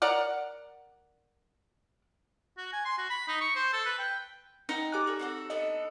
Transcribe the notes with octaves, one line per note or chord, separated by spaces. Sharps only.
A#4 D5 F#5
F#4
G#5
C6
F#4
B5
D#4
C#6
C5
A4
B4
G5
D#4 F#5 G5
G4 G#5 D6 F#6
A4 A#4 D5
C4 F#4 A4
B3 D4 A4 D#5